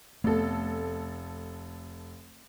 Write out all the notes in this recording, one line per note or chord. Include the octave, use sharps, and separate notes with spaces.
F1 A3 B3 A4